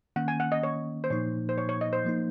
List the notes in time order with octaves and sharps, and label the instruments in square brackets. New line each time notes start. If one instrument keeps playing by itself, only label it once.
[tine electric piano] D#3 A#3 C#4 [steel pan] F#5
[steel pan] G#5
F#5
D#5
C#5
C5
[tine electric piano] A#2 F3 A#3 D#4 [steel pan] C#5
[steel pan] C5
C#5
C#5
D#5
C5
[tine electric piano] F3 A#3 D#4